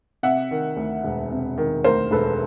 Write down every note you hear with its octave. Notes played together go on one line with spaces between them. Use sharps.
C3 E5 F#5
D#3
D2
E1
C3
D#3
D2 A#4 C5
E1 A4 B4